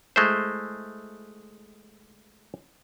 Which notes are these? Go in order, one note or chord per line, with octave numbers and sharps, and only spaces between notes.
G#3 A3 E4 C5